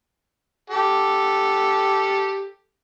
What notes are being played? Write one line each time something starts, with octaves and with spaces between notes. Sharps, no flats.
G4 A4